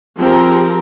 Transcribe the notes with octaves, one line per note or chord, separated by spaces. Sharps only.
F3 C4 G4 G#4 A#4